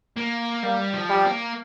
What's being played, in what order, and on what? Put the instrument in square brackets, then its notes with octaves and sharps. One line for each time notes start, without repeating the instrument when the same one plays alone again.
[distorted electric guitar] A#3
[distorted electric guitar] G3 [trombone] A#3
[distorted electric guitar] F3
[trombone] G3
[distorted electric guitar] A#3